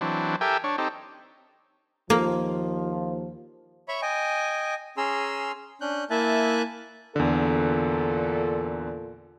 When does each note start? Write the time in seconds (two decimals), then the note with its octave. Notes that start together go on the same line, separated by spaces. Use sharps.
0.01 E3 F#3 C4 D4
0.41 G4 A4 A#4 E5 G5 G#5
0.64 D4 C#5
0.78 C4 D#4 G4 A4
2.10 D#2 F3 A#3
3.88 C#5 E5 B5 C#6
4.02 D#5 G5 G#5
4.97 C#4 G#4 A#5 C6 E6
5.81 C#4 D4 F#6 G6
6.10 A#3 E4 E5 G#5 A5 F#6
7.16 E2 A#2 D3 A4